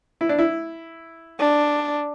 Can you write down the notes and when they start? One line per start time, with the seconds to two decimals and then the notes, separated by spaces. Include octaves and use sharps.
0.21 E4
0.29 D4
0.39 E4
1.39 D4